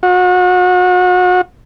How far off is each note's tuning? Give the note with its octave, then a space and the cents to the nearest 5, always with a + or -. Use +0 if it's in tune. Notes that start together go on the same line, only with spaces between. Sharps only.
F#4 -35